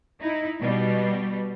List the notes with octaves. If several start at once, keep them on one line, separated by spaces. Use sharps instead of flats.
D#4 E4
B2 G3